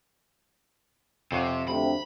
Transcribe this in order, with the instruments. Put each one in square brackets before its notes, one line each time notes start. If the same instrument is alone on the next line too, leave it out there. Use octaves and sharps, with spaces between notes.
[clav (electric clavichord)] F2 C#5 F#5 [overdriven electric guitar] C3
[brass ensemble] D2 C3 [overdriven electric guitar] B5